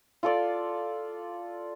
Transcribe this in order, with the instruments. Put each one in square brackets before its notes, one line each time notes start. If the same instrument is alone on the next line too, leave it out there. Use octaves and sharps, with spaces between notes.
[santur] F4 A4 D5